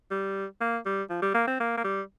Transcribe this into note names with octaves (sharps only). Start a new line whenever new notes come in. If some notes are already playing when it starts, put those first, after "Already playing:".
G3
A#3
G3
F3
G3
A#3
C4
A#3
A#3
G3